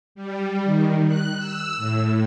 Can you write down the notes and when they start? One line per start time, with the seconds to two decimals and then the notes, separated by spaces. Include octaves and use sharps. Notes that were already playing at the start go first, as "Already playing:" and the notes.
0.15 G3
0.65 D#3
1.07 F#6
1.38 E6
1.77 A2